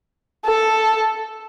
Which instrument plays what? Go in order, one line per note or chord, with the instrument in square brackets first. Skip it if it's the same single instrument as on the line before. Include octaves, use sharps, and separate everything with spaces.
[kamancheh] A4